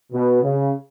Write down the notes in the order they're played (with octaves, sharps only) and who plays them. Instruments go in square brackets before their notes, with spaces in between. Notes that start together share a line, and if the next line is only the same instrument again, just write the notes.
[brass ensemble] B2
C#3